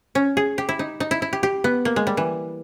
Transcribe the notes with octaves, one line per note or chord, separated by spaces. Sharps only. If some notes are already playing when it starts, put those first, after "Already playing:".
C#4
G#4
G4
E4
D#4
D#4
E4
E4
G4
G4
B3
A#3
G#3
G3
E3